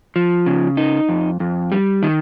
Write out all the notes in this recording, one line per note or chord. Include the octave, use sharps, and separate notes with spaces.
F3
C#3
D#4
F2
F2
G3
D#3